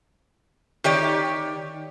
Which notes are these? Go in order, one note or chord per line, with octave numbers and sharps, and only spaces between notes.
D#3 G4 C#5 D5